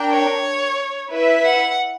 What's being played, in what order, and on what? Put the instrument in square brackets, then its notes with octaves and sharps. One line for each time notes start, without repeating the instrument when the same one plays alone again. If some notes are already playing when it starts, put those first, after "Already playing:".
Already playing: [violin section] D4 A#4 G5
[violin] C#5
[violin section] E4 B4 E5
[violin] F#5